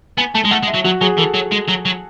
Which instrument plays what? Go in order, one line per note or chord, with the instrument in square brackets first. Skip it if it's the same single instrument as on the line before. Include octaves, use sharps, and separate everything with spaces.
[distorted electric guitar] B3 [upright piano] G#5
[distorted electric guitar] A3 [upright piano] A5
[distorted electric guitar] G#3
[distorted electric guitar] A3 [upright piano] F#5
[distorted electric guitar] G#3
[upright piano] E5
[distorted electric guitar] F#3
[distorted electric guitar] F#3 [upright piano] F#4
[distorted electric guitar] F#3 [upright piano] G#4
[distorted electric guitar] E3 [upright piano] A4
[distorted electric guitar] F#3
G#3
F#3
F#3